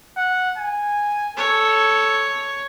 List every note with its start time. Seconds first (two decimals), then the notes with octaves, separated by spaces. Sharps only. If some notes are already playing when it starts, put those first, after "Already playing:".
0.17 F#5
0.58 G#5
1.37 A4 C#5